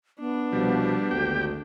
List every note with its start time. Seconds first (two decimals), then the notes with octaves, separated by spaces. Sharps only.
0.20 B3 D4
0.52 C2 B2 F3 G3
1.11 G#1 D2 G4 G5